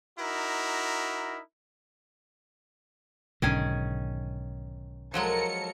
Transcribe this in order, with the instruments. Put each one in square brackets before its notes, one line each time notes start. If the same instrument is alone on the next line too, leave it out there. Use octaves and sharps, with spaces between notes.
[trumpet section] D#4 E4 F#4 A#4
[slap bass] B1 G#2 D3 [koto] D#3 C#4 G#4
[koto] F3 F#3 G#3 [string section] A4 A#4 C#7